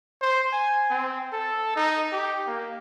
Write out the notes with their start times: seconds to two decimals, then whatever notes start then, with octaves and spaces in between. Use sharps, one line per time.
0.21 C5
0.53 G#5
0.90 C4
1.32 A4
1.76 D#4
2.12 G4
2.47 A#3